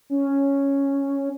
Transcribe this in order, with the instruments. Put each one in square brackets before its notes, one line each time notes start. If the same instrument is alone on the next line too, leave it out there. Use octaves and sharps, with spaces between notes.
[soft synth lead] C#4